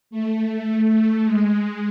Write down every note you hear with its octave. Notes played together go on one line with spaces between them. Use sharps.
A3
A3
G#3